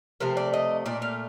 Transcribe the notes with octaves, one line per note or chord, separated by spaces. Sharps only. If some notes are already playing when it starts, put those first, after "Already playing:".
C3 F3 A3 A#4
D5
D#5
A#2 A3 D5
F5